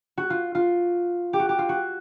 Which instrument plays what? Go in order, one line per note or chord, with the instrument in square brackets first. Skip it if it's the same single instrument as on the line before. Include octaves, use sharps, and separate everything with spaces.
[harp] F#4
F4
F4
G4
F#4
G4
F4
F#4